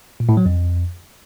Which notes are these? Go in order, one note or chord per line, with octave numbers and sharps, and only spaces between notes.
A#2
A2
F#3
F2